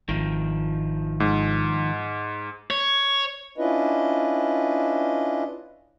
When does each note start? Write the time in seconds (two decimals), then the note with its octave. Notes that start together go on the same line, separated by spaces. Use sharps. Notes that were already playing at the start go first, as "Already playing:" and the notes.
0.09 G#1 D#3 F3
1.20 G#2
2.71 C#5
3.58 C#4 D4 E4 F4 B4 D#5